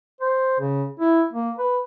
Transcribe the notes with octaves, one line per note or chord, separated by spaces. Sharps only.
C5
C#3
E4
A#3
B4